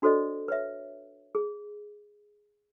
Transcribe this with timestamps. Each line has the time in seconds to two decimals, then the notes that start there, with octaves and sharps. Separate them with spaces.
0.02 D4 F#4 A4 C5 D5 D#5
0.48 B4 C#5 E5
1.35 G#4